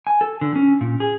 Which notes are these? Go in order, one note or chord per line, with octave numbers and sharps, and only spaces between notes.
G#5
A4
D3
C#4
A#2
G#4